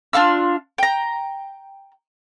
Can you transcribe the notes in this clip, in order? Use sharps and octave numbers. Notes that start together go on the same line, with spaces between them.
D4 F4 F5 E6
G5 A#5